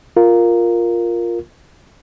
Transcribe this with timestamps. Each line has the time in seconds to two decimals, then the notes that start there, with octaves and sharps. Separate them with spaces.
0.17 F4 A#4